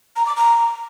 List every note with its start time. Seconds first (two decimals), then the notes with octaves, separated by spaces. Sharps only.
0.16 A#5
0.26 D6
0.37 A#5